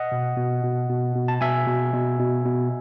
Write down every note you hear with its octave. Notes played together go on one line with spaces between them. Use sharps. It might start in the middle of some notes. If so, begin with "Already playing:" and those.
Already playing: D#5 F#5
B2
B2
B2
B2
B2
A5
B2 E5 G#5
B2
B2
B2
B2